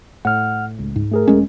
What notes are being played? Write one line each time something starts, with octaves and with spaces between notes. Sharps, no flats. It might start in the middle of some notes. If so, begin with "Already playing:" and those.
A2 F#5 F6
C#2
G#2
A3 G#4 A#4
D#1 G#3 C#4